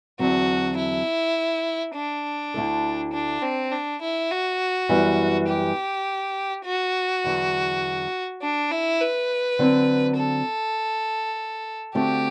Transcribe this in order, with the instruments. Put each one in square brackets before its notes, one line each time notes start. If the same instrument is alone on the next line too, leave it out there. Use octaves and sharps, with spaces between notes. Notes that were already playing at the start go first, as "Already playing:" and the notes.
[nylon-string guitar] E2 D3 F#3 C4 [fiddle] F#4
[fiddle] E4
D4
[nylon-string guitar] D2 D3 A3 E4 A4
[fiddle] D4
C4
D4
E4
F#4
[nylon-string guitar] F#2 E3 G3 B3
[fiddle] G4
F#4
[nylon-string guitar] E2 D3 F#3
[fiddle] D4
E4
B4
[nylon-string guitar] D3 F#3 C4
[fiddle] A4
[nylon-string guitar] D3 A3 C4 F#4 [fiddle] G4